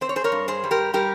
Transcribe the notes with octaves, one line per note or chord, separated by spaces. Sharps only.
C4 C5
C#5
G#4 C5
A#4 C#5
G2
G#4 C5
G3
G4 A#4
G3 G4 A#4